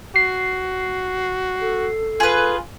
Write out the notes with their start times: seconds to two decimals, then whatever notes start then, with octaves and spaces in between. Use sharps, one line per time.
0.16 F#4 C7
1.61 A4
2.20 F4 G#4 B4